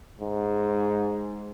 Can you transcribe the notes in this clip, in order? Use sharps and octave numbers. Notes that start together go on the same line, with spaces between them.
G#2